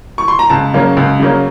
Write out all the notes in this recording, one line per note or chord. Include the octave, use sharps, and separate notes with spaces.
C#6
C6
A#5
C#2 A5
C#3 F#3 A#3 C#4
C#2
C#3 F#3 A#3 C#4